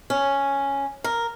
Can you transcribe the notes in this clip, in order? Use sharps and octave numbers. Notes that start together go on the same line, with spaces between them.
C#4
A#4